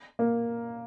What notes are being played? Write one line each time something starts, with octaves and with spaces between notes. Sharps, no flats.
A#3